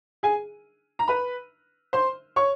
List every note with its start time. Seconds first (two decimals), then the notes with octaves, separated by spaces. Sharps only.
0.23 G#4 G#5
0.99 A#5
1.08 B4 B5
1.93 C5 C6
2.36 C#5 C#6